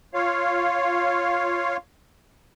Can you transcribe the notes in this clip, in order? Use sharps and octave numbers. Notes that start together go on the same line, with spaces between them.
F4 C#5 F5